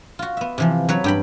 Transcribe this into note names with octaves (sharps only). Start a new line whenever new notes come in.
F4 F#4
B3 E5
C3 E3 F3
F#3 B4 C#5
G2 G5 B5